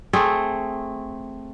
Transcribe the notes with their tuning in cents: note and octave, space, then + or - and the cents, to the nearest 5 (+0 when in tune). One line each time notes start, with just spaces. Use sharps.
A3 +0 C4 +0 G#4 -10